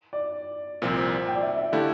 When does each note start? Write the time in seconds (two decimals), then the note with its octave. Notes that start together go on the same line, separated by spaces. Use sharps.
0.13 D5
0.82 C2 A#2 F3 C4
1.26 G5
1.35 D5
1.42 E5
1.57 E5
1.72 D3 A3 E4 G4 F5